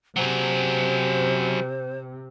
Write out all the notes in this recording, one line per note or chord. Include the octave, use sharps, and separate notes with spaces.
C3 F#3 G#4 C5